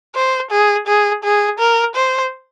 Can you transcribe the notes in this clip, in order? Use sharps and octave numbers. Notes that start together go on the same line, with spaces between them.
C5
G#4
G#4
G#4
A#4
C5